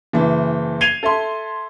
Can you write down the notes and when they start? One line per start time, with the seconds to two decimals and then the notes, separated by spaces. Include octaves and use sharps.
0.13 F#1 E3 E4
0.81 G#6 C7 D#7 F7 G7
1.03 A4 E5 C6